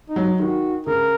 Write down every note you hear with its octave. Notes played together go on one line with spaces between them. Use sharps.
D#4
F#3
D#3 F#4
C#3 A#4